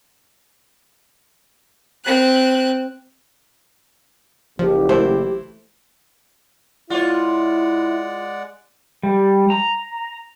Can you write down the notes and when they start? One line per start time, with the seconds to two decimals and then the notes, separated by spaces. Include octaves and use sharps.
2.05 C4 F#6
4.59 F#1 F3 G4
4.89 E3 A3 E4 C5
6.90 G#3 E4 F4 C#5 D5 F#5
9.03 G3
9.50 A#5